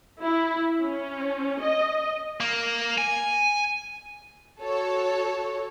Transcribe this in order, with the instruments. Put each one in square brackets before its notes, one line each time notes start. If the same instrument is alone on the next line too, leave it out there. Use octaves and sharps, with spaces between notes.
[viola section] E4
C#4
D#5
[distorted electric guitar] A#3
G#5
[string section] F#4 A4 C#5